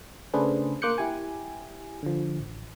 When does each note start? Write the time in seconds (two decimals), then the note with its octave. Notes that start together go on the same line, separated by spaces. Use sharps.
0.34 C#3 A3 D4 G#4 B4 C5
0.82 A#3 C6 D6 F#6 G6 C#7
0.98 E4 G4 G#5
2.03 D3 F3
2.39 A1